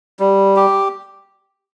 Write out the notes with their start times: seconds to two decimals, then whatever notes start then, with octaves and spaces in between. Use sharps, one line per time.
0.19 G3
0.56 G4